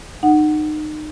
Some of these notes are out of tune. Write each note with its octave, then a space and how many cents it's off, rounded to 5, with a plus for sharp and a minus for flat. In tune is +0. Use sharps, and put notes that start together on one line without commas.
D#4 -30 F#5 +5